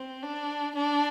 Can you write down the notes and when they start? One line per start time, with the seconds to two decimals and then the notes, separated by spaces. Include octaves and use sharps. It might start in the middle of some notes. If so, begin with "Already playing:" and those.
Already playing: C4
0.23 D4
0.75 D4